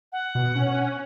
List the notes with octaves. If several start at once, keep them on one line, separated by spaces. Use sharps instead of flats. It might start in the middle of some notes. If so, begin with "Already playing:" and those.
F#5
B2
C#4